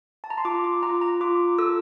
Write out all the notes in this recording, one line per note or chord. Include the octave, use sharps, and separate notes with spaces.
A5
A#5
C6
F4 D6
D6
F4 A#5
A#5
F4 D6
A4 E6